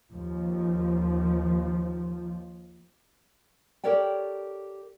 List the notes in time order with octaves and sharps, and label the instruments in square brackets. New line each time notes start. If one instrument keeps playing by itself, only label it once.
[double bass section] D#2 F3
[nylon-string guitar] G4 A4 A#4 C#5 D5 G5